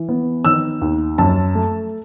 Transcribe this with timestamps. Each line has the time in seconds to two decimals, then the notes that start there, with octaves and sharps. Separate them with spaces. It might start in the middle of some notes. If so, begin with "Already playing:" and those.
Already playing: E3
0.09 B3
0.45 D#3 E6
0.81 D#2
1.18 F#2 A5
1.55 A3